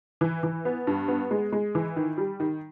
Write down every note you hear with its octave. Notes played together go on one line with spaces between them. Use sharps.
E3
E3
B3
G2
B3
G#3
G#3
E3
D#3
G3
D#3